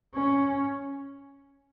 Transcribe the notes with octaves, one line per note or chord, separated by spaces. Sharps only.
C#4